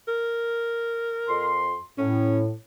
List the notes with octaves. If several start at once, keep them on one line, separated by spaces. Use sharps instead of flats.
A#4
F2 C6
A2 C#4